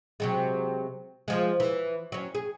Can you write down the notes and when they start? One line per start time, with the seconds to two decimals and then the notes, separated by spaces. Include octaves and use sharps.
0.20 C3 F#3 G#3
1.28 F3 G#3
1.60 E3
2.12 F#3 C#4
2.35 G#4